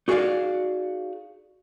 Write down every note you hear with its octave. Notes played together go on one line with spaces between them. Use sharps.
D#4 F#4 G#4 B4 D5 F5